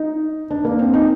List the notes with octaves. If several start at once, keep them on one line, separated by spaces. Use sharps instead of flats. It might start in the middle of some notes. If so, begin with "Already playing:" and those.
Already playing: D#4
D4
A#3
C4
D#4